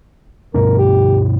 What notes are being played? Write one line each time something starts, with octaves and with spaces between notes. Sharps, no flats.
G2 B2 D4 A#4
G4